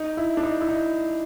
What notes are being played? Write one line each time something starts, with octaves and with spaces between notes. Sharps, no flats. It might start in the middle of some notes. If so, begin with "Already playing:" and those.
Already playing: D#4
E4
D4
D#4
E4
D#4